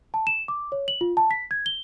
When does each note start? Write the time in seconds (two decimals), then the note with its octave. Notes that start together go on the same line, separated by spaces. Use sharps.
0.14 A5
0.27 E7
0.48 D6
0.72 C#5
0.88 F#7
1.01 F4
1.17 A5
1.31 B6
1.51 G#6
1.66 G7